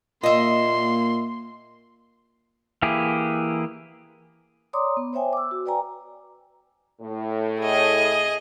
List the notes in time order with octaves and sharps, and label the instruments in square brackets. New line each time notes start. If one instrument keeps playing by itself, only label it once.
[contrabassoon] A#2 [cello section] A#3 [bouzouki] D#5 E5 [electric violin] C6
[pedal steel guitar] E3 A#3 E4 G4 G#4
[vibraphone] C#5 D5 A#5 C6 D6 D#6
B3
C5 C#5 E5 G5 G#5
D6 E6
F#4
B4 D5 G5 G#5 A#5
[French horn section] A2
[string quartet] G#4 D#5